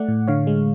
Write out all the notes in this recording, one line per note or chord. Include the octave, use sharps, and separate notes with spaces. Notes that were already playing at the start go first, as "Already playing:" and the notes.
Already playing: A3 D5 F#5
A2
D3 C#5 F5
G#3